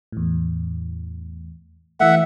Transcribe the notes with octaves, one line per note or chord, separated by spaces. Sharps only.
E2 A2
E3 A3 E5 F#5